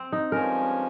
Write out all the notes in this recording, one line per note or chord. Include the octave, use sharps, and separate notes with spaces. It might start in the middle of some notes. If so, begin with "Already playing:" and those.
Already playing: C4
D#4
G2 F3 G#3 C#4 A#4